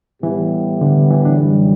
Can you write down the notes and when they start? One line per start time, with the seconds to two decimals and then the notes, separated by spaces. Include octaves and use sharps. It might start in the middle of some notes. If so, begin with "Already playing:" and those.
0.23 A2 E3 G3 B3 E4 G4
0.81 D3
1.10 E3
1.25 D4
1.39 F#2 E3 G3